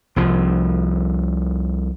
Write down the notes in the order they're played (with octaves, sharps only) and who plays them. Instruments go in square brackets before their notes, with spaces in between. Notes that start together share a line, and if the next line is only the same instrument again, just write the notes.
[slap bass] C2 F3